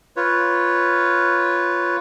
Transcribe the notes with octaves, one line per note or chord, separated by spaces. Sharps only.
F4 B4 C#5